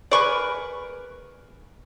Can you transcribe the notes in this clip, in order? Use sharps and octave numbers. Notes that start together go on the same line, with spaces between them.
G#4 A#4 B4 D5 C#6